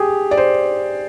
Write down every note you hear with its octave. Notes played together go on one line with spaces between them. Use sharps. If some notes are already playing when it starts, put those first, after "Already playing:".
Already playing: G4 G#4
D5
C5